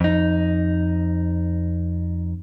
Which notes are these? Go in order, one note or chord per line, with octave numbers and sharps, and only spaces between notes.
F2 D#4